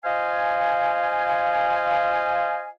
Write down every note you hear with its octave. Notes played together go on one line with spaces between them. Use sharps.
F4 C5 D#5 F5 G#5